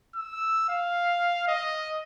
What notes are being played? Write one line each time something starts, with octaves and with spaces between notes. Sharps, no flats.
E6
F5
D#5